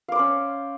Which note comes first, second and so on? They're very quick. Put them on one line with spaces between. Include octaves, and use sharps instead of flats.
F5 D5 C5 C#4